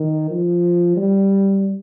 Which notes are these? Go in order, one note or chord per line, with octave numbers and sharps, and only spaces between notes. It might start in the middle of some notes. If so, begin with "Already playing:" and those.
Already playing: D#3
F3
G3